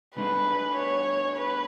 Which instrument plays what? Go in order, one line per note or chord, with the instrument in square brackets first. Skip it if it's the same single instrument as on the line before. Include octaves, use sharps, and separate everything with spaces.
[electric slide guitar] B2 A3 D4 G#4 [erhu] B4
[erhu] C#5
B4